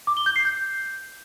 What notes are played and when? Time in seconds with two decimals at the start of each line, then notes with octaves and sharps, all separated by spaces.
0.07 D6
0.17 G7
0.26 G6
0.36 C7
0.45 G6